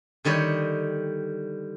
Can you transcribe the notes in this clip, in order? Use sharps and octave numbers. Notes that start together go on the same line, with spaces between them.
D3 D#3 G3 C#5 D#5